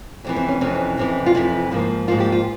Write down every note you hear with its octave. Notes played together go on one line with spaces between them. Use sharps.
F2 C3 E3
C4
C#4
F2 C3 E3 C#4
F2 C3 E3
F4
F2 C3 E3 E4
G#2 F3 A#3
G#2 F3 A#3 F4
G4
F4